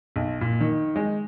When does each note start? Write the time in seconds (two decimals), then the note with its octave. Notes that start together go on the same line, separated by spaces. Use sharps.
0.16 B1
0.41 A#2
0.60 D#3
0.96 G#3